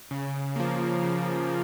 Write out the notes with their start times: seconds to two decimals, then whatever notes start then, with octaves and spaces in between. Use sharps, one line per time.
0.11 C#3
0.56 F3 A#3
1.03 C#3